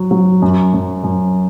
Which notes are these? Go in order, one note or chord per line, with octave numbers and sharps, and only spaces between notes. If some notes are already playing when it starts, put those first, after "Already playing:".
Already playing: F#3
F#3
F#2
F#2
F#2